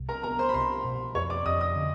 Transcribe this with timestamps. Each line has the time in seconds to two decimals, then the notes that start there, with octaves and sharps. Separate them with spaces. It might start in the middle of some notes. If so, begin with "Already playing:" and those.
Already playing: C2
0.09 A#4 A#5
0.23 B3 A#4 A#5
0.39 C5 C6
0.49 B5
0.54 C2 C5 C6
0.84 B2
1.15 F2 C#5 C#6
1.30 D5 D6
1.46 F2 D#5 D#6
1.60 D#5 D#6
1.76 D3